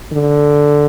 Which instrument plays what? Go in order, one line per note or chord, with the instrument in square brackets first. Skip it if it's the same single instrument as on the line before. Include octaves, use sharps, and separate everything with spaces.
[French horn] D3